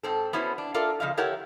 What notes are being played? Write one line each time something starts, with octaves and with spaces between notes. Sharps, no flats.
G#2 C4 A4
B3 C#4 E4 F#4 C5
D4
F4 A4 A#4 D5 E5
C#3 F3 D#5 F5
E4 G4 A4 A#4 C#5 F#5